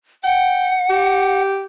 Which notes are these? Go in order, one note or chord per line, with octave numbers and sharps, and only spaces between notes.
F#5 G5
G4